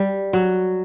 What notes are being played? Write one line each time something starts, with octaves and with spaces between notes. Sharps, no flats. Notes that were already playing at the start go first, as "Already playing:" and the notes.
Already playing: G3
F#3